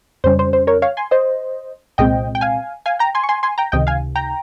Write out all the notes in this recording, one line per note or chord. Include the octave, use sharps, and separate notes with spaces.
F2 C#3 G3 C#4 C5
C5
C5
A#4 C#5
C#5 F5
G#5 C6
C5 D#5
C2 A#2 G#3 C4 D#5 G5
G5
F5 G#5
F5 G#5
G5 A#5
G#5 C6
C#6
G#5 C6
G#5 C6
G5 A#5
C#2 C3 D#3 D#5 G5
F5 G#5
G5 A#5